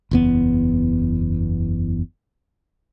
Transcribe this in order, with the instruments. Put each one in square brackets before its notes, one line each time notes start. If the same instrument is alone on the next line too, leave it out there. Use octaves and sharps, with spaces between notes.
[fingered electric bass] F#1 E2 B3